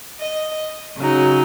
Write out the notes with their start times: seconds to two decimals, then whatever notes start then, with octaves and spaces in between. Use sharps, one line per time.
0.21 D#5
0.98 C#3 F#3 D#4